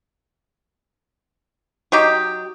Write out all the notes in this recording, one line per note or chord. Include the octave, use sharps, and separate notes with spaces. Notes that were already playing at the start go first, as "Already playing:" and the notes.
F#3 D#4 G4